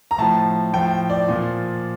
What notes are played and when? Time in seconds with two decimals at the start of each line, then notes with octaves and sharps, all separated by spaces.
0.11 A#5
0.18 A2 F3 A5
0.73 A2 F3 G5
1.10 D5
1.28 A#2 F3